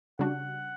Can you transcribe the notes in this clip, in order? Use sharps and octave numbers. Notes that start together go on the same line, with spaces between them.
C#3 G3 D4 F#4 F#5